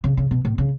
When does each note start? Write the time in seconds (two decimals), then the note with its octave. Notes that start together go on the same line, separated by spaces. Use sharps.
0.04 C#3
0.17 C#3
0.31 B2
0.45 A2
0.58 C#3